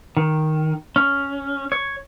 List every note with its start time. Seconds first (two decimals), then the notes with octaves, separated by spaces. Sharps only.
0.17 D#3
0.96 C#4
1.72 C#5